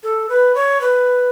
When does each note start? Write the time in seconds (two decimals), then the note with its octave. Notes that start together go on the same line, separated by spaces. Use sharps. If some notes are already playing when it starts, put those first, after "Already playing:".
0.03 A4
0.29 B4
0.55 C#5
0.81 B4